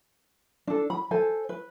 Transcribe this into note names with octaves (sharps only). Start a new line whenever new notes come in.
D4 A4
B5
A4 C5 G#5
B4